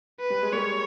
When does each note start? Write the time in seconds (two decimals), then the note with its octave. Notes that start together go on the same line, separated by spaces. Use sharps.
0.20 B4
0.30 G3
0.42 G#3
0.53 G3 A#3 C#5